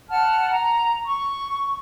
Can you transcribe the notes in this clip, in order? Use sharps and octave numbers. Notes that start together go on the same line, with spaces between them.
F#5 A5 F6
A#5
C#6